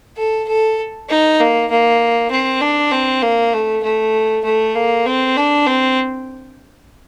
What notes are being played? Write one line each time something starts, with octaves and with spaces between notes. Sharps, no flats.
A4
A4
D#4
A#3
A#3
C4
D4
C4
A#3
A3
A3
A3
A#3
C4
D4
C4